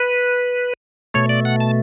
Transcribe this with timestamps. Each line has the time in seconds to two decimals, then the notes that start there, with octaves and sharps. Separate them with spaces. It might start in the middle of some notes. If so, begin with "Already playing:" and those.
Already playing: B4
1.14 B2 A3 C#5
1.29 D5
1.45 F#5
1.60 A5